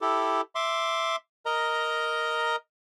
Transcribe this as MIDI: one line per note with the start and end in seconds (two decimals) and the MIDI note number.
0.01 0.41 64
0.01 0.41 67
0.01 0.41 69
0.55 1.16 76
0.55 1.16 84
0.55 1.16 86
1.46 2.56 70
1.46 2.56 75
1.46 2.56 82